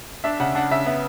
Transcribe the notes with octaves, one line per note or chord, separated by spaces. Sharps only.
D4 E5
C#3 F#5
D4 F#5
C#3 E5
B3 E5